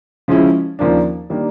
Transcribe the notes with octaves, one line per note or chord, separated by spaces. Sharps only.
C#3 F3 G#3 C#4 E4
D#2 C#3 F3 A#3 D4
D#3 G3 A#3 D4